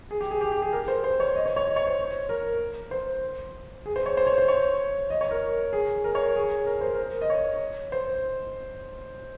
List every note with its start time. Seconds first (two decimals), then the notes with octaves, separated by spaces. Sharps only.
0.11 G#4
0.21 G4
0.31 G#4
0.41 G4
0.52 G4
0.62 G#4
0.73 A#4
0.88 C5
1.04 C5
1.20 C#5
1.36 D#5
1.46 C#5
1.56 C#5
1.66 D#5
1.76 C#5
1.87 C5
2.29 A#4
2.91 C5
3.86 G#4
3.96 C5
4.06 C#5
4.17 C5
4.27 C#5
4.38 C5
4.48 C#5
5.10 D#5
5.21 C#5
5.31 A#4
5.73 G#4
6.04 A#4
6.15 C#5
6.36 G#4
6.66 A#4
6.81 C5
6.95 A#4
7.21 D#5
7.30 C#5
7.92 C5